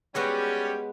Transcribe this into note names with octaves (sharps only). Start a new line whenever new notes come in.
G3 G#3 B3 C#4 F#4 G4